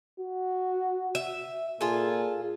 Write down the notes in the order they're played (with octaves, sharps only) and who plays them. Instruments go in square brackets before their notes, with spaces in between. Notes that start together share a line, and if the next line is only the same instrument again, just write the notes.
[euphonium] F#4
[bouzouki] E5
[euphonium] A#2 [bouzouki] F4 G#4 A4